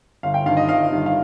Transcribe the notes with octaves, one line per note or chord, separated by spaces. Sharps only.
G1 F5
G5
G2 D#3 F5
D#5
G1 F5
G2 D#3
F5